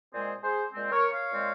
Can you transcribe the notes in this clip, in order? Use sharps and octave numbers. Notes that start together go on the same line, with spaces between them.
A#2 G#3 C4 G#4 C5
G#4 C5
A#2 G#3 C4
A#4 C#5
C#5 F5
A#2 G#3 C4